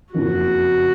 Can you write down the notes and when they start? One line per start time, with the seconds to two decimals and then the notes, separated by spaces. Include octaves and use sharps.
0.14 F#1 F2 C#3 F3 A#3 F#4